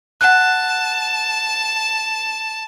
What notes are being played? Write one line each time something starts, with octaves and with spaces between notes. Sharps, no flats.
F#5 A5 F#6